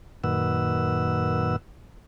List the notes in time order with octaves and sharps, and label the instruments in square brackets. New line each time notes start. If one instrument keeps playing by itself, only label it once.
[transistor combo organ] F#2 A#2 D#3 B4 F#5 E6